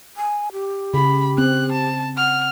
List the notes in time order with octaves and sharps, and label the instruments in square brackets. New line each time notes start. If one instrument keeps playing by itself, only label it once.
[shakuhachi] G#5
G4
[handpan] C#3 [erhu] B5
[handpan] C4 [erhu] F#6
[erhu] A5
[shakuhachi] F#5 [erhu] F6